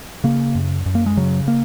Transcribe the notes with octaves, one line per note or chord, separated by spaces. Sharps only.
C#3 A#3
F#2
F#2
A#3
G#3
C#3 F#3
A#3